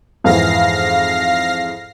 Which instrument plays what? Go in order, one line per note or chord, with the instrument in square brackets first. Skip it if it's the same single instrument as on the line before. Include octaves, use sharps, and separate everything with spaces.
[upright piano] F2 G#2 E3 [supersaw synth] F5 A#6 C7